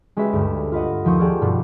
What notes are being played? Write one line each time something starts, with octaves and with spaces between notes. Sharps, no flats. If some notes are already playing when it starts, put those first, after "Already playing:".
G#3 C#4 F#4 G4 B4 E5
D2 G2
F4 B4 D#5 F#5
D#2 F3 A3 C5 C#6 D#6
F4 G4 G#4 D5 F#5 A5
G2 B2 B3